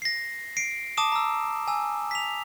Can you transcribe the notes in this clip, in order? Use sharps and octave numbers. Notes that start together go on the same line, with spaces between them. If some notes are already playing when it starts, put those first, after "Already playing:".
A#6 C7
C7 D7
A5 D6 D#6 E7
A#5 E6
G#5 E6
B6 F7